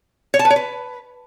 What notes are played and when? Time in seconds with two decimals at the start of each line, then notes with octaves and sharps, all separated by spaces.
0.34 C#5
0.39 A5
0.45 B4
0.50 C#5
0.56 B4